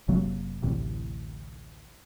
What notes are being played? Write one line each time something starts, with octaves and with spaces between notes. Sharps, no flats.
F#1 C3 F#3 A#3
A1 D2 A2 C3